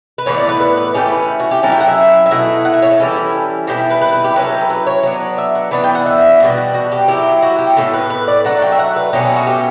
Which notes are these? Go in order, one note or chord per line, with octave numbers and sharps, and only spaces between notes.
B4
A2 E3 B3 C#5
D5
B4
B4
B4
E3 A3 C#4 G4
B4
F#4
G4
F#3 C#4 E4 A4
G5
F#5
E5
E5
B2 A3 E4 F#5
F#5
E5
C#5
A4
E3 G3 C#4 E4
B2 G3 C#4 E4 G4
B4
B4
B4
G4
F#3 C#4 E4 B4
A4
G4
A4
B4
C#5
F#3 B3 D4 C#5
E5
F#5
E3 B3 D4 F#5
G5
F#5
E5
B2 G3 D4 F#4
F#4
F#4
G4
F#3 A3 E4 G4
F#4
G4
A2 E3 B3 A4
B4
B4
D5
F#3 A3 D4 F#5
G5
E5
F#5
B4
B2 F#3 A3 C#4 G4
F#4
F#4
G4